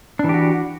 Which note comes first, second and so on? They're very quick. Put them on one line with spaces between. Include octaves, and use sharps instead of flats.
D4 E3 G4 F#4